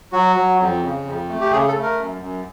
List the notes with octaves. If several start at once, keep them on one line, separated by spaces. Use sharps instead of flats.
F#3 F#4
F#3
F2
C#3
F2
A3
G4
C#3 G#4
A4
A3
A#4
F#2
F#2